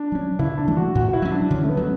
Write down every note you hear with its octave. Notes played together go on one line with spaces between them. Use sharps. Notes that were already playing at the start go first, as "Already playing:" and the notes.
Already playing: D4
F#3 C#4
C#3 E4
D4
E3 A3
F#4
A2 F#4
F#4
E4
F#3 C#4
D4
D3 C#4
A3
B3
F#3 C#4